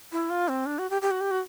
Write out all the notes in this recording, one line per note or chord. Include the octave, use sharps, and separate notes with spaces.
E4
F4
C4
D4
F#4
G4
G4
F#4
G4
F#4